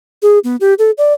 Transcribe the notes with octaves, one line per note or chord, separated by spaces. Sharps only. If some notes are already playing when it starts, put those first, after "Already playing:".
G#4
B3
G4
A4
D5